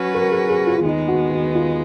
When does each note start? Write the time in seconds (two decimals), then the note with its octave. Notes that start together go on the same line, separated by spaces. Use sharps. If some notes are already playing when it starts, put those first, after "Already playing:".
Already playing: F#3 C#4 F#4 B4
0.14 A#4
0.31 G#4
0.49 G#4
0.67 F4
0.78 F4
0.85 D#2 D#3 G#3 B3 D#4
1.08 F#4
1.31 F#4
1.55 F4